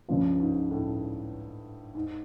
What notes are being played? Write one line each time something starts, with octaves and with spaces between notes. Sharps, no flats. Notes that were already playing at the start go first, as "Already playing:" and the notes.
C#2 G2 C#3 F3
G#2
A2
G#2